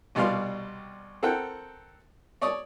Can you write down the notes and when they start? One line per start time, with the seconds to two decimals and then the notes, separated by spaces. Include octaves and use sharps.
0.15 C2 B2 G3 D5 F5 C6
1.23 C4 A4 A#4 F#5 G5
2.42 C#5 D5 C#6 D#6